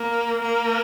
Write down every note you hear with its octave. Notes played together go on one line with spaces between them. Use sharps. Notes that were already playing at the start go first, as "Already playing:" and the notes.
Already playing: A#3
A#3